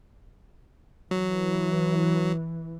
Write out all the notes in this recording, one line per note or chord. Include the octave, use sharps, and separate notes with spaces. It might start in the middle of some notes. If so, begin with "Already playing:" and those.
E3 F#3